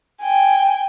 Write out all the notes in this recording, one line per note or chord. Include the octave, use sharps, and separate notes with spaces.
G5 G#5